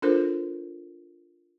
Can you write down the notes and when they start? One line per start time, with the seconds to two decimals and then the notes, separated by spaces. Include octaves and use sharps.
0.02 D4 F4 A4 A#4 C5